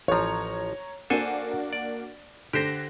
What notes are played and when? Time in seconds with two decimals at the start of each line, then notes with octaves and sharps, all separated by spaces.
0.08 A1 F3 C#5 A#5
1.10 A#3 D4 F#4 A4 C5 G#5
1.73 D5
2.53 D3 G4 C5 A#6